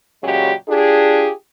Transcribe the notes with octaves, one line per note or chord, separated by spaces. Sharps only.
A#2 C#3 F#3 G#3 G4
D4 F4 G4 G#4